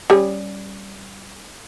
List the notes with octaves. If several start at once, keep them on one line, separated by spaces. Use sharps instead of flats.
G3 C#4 G#4